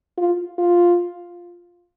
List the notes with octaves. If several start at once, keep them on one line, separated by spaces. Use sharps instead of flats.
F4
F4